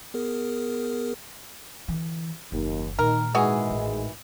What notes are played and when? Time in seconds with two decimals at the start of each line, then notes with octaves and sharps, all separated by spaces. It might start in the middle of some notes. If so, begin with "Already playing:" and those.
0.14 B3 G#4 A#4
1.88 D3 E3
2.52 F#1 D#2
2.99 A#2 D#3 A#4
3.35 G#2 D#3 E3 G#3 F#4 G#4
3.70 A1